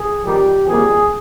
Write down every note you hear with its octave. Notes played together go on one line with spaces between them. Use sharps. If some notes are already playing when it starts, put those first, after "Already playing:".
Already playing: G#4
F2 D#3 G3 G4
F2 D#3 G3 A#3 G#4